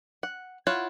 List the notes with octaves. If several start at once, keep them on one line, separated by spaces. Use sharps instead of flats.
F#5
E4 F4 C#5 F#5